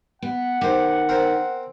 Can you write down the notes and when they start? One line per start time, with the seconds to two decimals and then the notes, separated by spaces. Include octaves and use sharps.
0.22 B3 F#5
0.61 D#3 G4 C5
1.09 C4 A#4 C5